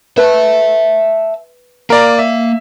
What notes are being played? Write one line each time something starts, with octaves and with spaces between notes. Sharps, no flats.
B4 E5 A5
A#3 A#4 D5 F5 A#5
E5